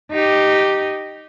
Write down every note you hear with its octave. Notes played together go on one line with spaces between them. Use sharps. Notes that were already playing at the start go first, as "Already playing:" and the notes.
D#4 G4